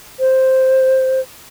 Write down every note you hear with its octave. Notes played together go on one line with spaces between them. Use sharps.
C5